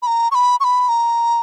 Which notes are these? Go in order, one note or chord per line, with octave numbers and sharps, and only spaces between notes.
B5
A#5
C#6
B5
C#6
B5
A#5